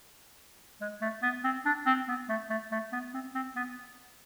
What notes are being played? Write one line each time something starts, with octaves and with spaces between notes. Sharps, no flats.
G#3
A3
B3
C4
D4
C4
B3
A3
A3
A3
B3
C4
C4
B3